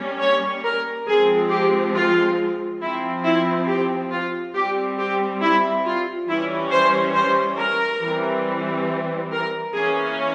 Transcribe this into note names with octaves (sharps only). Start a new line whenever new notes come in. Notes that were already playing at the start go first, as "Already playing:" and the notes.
Already playing: G3 A#3 C#4
C#5
A#4
F3 G#3 C4 G#4
G4
F4
F3 C4 E4
E4
G4
F4
G3 C4 G4
G4
E4
F4
E3 G3 C#4 E4
C5
C5
A#4
E3 G3 C4
A#4
E3 A#3 C#4 G#4